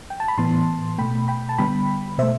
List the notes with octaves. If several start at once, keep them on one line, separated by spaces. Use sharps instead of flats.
G5
A5
B5
A2 E3 B3 A5 C6
B2 A3 G5 B5
G5 B5
A5
D3 G3 B3 G5 B5
B2 A3 C5 E5